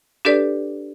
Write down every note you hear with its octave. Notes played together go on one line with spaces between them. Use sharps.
D4 G4 A4 B4 D5